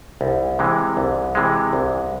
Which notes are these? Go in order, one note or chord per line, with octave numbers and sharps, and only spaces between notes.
C2
C3 E3 G#3
C2
C3 E3 G#3
C2